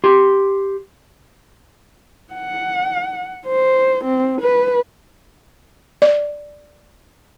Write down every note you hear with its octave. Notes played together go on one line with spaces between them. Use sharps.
G4 C6
F#5
C5
C4
B4
D5